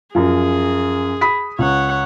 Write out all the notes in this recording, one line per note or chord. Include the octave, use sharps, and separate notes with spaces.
F#2 F3 G#4
B5 D#6 B6
C#2 C#5 F#5